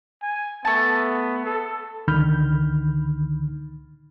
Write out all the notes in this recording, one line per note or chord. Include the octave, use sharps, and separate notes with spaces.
G#5
A3 B3 A5
A4
C#2 D3 D#3 B5 F6 G6